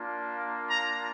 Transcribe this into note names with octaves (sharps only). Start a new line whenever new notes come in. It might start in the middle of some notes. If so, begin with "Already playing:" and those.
Already playing: A#3 D4 F4
A#5